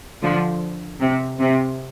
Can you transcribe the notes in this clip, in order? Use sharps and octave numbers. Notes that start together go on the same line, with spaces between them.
D3 F3
C3
C3